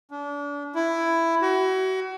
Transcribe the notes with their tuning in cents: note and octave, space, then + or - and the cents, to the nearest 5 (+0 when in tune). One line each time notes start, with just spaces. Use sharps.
D4 -35
E4 +10
F#4 +35